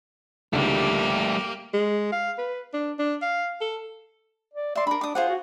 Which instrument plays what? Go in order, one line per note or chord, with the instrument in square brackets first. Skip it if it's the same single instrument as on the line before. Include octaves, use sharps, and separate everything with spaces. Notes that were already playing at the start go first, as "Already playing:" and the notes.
[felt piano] C#2 D3 D#3 [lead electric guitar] G3 A3 [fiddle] A#3 G4
[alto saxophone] G#3
F5
B4
D4
D4
F5
A4
[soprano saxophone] D5
[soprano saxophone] D5 [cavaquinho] E5 C6
[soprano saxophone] D4 [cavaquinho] A#4 B5
[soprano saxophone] D4 [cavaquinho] D6 D#6
[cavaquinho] F4 G#4 F#5 [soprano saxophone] C5
[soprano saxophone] F#4